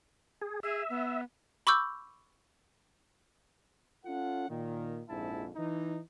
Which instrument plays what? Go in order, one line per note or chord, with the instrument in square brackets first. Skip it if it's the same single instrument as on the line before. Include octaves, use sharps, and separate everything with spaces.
[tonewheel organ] G#4
[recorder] G#4 [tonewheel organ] E5
[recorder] B3
[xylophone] B5 C#6 D6 E6 G6
[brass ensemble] C#4 F4 A4 F#5
A#2 D#3
A#1 F2 G#2 E4 A5
E3 D#4